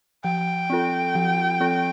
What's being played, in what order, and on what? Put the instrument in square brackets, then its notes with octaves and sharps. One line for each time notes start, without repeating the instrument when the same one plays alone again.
[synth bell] F3 [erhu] G5
[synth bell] C4 F4 A4
F3
C4 F4 A4